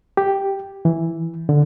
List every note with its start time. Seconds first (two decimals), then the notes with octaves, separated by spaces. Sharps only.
0.17 G4
0.85 E3
1.49 D3